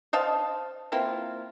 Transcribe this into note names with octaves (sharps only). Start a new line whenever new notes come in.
C5 D#5 F5 A5
A#3 C4 E4 F4